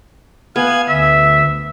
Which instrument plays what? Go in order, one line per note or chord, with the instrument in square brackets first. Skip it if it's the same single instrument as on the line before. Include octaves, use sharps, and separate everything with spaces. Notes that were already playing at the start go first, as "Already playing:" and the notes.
[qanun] B3 [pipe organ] F5 G#5 G#6
[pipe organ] D2 [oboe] E5